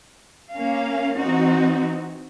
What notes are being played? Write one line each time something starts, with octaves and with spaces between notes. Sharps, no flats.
A#3 C#4 F5
E3 C4 D#4 F#4